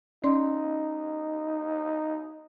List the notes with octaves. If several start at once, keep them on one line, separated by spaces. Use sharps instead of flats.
C#4 D#4 D5 C6